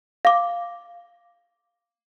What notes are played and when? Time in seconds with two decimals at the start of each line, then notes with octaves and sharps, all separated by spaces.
0.25 F5 D6